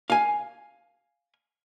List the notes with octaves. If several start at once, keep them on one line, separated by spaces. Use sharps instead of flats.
F5 G#5